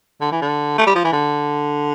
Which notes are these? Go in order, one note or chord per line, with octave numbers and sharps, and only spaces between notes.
D3
E3
D3
A3
G3
F3
E3
D3